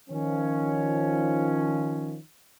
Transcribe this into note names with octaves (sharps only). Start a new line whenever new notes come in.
D#3 F3 C#4